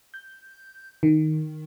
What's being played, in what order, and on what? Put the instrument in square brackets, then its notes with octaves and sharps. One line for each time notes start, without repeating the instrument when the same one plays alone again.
[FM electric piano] G6
D#3